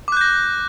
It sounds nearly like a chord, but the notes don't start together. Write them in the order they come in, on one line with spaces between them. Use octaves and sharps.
D6 F#6 G6 A#6